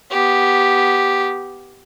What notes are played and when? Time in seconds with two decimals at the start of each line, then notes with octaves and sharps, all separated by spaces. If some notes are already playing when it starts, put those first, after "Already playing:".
0.11 B3 G4